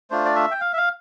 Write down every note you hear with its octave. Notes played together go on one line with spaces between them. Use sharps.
A3 D4 F4 C5
D5
E5
G5
F5
E5
F5